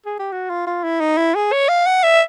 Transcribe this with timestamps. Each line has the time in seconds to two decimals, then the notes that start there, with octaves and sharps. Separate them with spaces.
0.06 G#4
0.19 G4
0.32 F#4
0.50 F4
0.67 F4
0.84 E4
1.00 D#4
1.17 E4
1.35 G#4
1.52 C#5
1.69 F5
1.86 F#5
2.03 E5